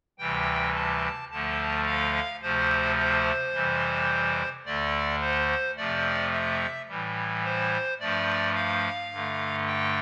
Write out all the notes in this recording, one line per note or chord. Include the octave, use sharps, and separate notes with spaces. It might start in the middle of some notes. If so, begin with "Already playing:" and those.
D2 C3 E3 G3 G5
A5
D2 D3 F3 A3 A5
F5
D2 C3 F3 A3 C5
C5
F2 C3 E3 G3
D2 D3 A3 D5
C5
F2 C3 F3 A3 D5
E5
A2 E3 G3
C5
G2 F3 A3 D5
F5
G2 D3 A3
G5